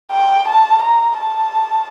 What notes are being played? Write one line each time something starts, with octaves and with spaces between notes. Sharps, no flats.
G5
A5
A#5
A5